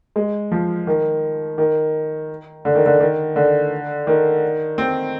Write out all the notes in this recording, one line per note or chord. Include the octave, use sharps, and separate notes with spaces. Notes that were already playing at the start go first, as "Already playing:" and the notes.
G#3
F3
D#3
D#3
D3
D#3
D3
D#3
D3
D#3
C4